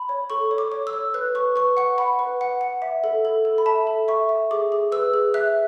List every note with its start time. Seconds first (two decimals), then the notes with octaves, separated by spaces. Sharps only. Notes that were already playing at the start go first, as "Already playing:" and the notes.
Already playing: B5
0.09 C#5
0.30 A4 C#6
0.51 C#5
0.58 D6
0.72 C#5
0.87 E6
0.93 C#5
1.14 B4 F#6
1.35 B4 C#6
1.56 B4 C#6
1.77 F#5 C#6
1.98 F#5 B5
2.19 B4
2.41 F#5
2.61 F#5
2.82 E5
3.04 A4
3.25 A4
3.45 A4
3.58 B5
3.66 E5 A5
3.87 A4
4.08 E5 C#6
4.29 E5
4.51 G#4 D6
4.72 G#4
4.92 B4 E6
5.14 G#4
5.34 E5 F#6